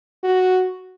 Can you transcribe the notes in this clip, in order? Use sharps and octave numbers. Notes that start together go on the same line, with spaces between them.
F#4